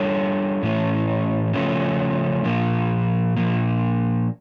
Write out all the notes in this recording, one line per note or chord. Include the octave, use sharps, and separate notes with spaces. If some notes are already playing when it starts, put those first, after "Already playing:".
Already playing: G3 D4 A4 C#5
A2 E3 A3 C#4
C#3 F3 A3 C#4
A#2 F3 A#3
A#2 F3 A#3